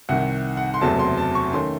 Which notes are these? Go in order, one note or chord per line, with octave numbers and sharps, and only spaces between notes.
C2 C3 D#3 F#5
F#5
C6
F#1 E2 C3 F#3 A3 A5
C6
A5
C#6
D#3 A3 C#4 C6